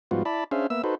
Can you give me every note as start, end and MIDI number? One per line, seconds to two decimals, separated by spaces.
0.11 0.23 44
0.11 0.23 53
0.11 0.23 55
0.11 0.23 59
0.11 0.23 65
0.11 0.23 66
0.25 0.44 64
0.25 0.44 74
0.25 0.44 81
0.25 0.44 83
0.51 0.67 61
0.51 0.67 62
0.51 0.67 68
0.51 0.67 72
0.51 0.67 76
0.51 0.67 77
0.70 0.82 58
0.70 0.82 59
0.70 0.82 76
0.70 0.82 88
0.84 0.95 63
0.84 0.95 66
0.84 0.95 69
0.84 0.95 71
0.84 0.95 72